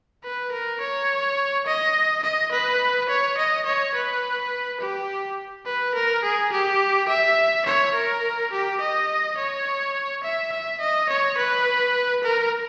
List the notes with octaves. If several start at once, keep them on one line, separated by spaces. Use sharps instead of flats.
B4
A#4
C#5
D#5
D#5
B4
C#5
D#5
C#5
B4
G4
B4
A#4
G#4
G4
E5
C#5
A#4
G4
D#5
C#5
E5
E5
D#5
C#5
B4
A#4